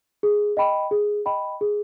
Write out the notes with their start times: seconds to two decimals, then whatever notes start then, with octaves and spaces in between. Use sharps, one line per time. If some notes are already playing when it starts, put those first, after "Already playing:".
0.23 G#4
0.57 D#5 G5 B5
0.91 G#4
1.26 D#5 G5 B5
1.61 G#4